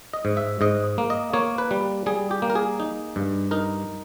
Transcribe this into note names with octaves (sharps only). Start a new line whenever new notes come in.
D#5
G#2
E5
G#2 D#5
A#3
D#5
A#3 C#5
B4
G3
G3 G#4
G4
A#3
A#4
G#4
D#4
G2
D#4 A#4